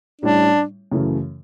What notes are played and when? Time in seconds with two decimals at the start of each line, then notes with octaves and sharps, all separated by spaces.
0.21 A2 G3 C#4 D4 E4
0.92 F#2 C#3 E3 A3